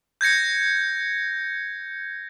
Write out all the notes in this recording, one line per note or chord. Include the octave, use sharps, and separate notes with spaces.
G6 G#6 A#6 C#7